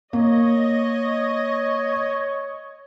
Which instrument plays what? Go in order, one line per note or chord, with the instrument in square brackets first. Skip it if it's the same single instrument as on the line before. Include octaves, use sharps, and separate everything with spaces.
[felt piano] A#3 [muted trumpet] C#5 [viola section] D#5